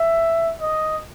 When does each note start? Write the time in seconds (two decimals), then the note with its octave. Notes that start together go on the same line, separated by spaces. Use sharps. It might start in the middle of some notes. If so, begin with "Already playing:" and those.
Already playing: E5
0.61 D#5